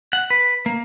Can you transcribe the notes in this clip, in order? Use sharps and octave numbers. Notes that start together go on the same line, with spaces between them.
F#5
B4
A#3